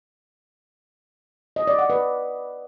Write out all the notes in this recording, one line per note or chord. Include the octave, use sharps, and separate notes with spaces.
D#5
D5
F#5
B4